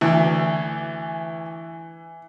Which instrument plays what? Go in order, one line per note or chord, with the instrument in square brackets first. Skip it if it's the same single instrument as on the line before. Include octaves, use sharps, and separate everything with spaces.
[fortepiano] D2 [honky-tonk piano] E3